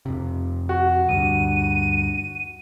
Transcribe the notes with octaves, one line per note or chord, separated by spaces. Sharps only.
F2 C3
F#4
D2 G2 D#7